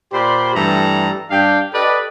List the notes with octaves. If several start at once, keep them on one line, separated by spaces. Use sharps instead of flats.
A#2 G4 C5 D5 B5 C6
G2 E3 G3 A3 A4 A#5
G2 D4 F5 G5
G4 A4 B4 D5 D#5